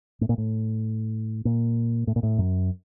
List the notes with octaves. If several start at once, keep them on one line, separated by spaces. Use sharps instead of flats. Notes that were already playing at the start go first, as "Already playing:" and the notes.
A2
A#2
A2
A#2
A2
A#2
A2
F#2